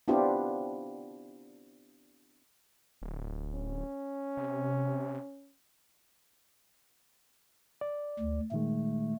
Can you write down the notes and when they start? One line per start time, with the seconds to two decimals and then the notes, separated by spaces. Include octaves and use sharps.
0.08 B3 C4 D4 E4 F4 G4
3.02 D1
3.53 C#4
4.37 C3
7.81 D5
8.20 D2
8.52 A#2 D#3 G#3 A3